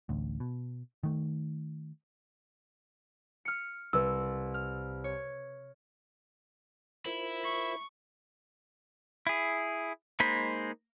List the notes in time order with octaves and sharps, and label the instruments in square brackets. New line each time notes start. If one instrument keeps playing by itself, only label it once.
[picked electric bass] A1 D2
B2
D#3 A3
[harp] F6 C#7
[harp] C2 [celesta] B4 E6
[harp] F6
C#5
[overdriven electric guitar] E4 [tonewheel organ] F4 A#4 C5
[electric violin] C#6
[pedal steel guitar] E4 G#4
G#3 A#3 D#4 C5 B5